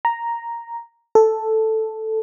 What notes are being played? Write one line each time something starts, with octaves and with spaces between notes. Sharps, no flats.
A#5
A4